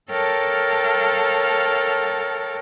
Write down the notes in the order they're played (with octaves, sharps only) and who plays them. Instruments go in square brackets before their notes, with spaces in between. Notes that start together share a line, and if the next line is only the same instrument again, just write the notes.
[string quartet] A4 A#4 C#5 F5 G5 A5